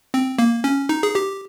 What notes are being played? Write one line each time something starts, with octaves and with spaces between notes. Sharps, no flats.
C4
A#3
C#4
D#4
G#4
G4